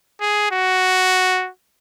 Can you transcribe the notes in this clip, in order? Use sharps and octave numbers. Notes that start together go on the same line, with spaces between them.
G#4
F#4